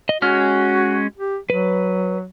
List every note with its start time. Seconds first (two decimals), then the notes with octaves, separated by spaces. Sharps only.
0.09 D#5
0.22 G#3 C#4 F#4 F6
1.17 G4
1.50 F#3 B4